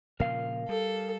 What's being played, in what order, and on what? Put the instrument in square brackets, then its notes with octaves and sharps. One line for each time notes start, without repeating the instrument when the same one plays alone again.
[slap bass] A#2 C#3 F3 [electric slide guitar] A#4 F5
[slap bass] G3 [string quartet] A4